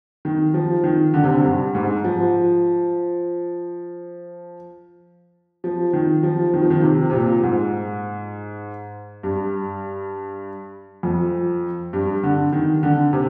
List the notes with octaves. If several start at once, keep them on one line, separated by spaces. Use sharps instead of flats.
D#3
F3
D#3
D3
C3
D3
G2
G#2
F3
F3
D#3
F3
D#3
F3
D#3
C3
C3
A#2
G#2
G2
F2
G2
D3
D#3
D3
C3